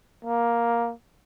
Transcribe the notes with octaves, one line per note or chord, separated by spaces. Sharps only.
A#3